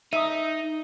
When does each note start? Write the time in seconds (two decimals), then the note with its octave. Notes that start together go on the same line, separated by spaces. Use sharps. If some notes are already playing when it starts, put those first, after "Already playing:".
0.13 D#4 E5 D#6 D#7